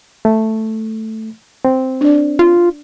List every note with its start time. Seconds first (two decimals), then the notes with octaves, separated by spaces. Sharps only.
0.25 A3
1.65 C4
2.01 D4 D5
2.39 F4